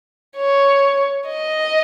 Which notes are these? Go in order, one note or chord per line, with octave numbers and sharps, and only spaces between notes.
C#5
D#5